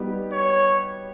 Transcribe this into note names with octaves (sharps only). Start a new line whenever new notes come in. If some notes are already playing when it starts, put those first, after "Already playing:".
Already playing: G3 B3 D#4 G4
C#5